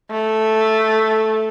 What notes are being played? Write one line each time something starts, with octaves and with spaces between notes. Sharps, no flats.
A3